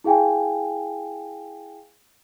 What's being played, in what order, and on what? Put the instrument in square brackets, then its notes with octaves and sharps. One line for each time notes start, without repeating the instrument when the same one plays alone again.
[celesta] E4 G#4 F5 G5 G#5